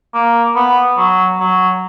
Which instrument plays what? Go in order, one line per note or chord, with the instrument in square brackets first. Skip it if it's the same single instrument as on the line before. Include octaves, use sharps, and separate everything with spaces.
[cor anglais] A#3
B3
F#3
F#3